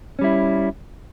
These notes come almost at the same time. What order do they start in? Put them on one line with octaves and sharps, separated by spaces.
C#4 G3 E4